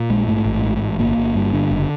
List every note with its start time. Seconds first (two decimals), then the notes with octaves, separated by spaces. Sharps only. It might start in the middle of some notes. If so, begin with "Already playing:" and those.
Already playing: A#2
0.10 A#1 G#3
0.28 G#2 A3
0.45 A1
0.63 G#2
0.82 A1
0.99 G1 A#3
1.17 G1
1.35 G2
1.53 D3
1.71 F#1